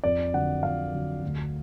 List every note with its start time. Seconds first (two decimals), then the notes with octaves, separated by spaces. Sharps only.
0.04 F2 D5
0.34 D3 F#3 F#5
0.63 F2 F5
0.93 D3 F#3
1.23 D2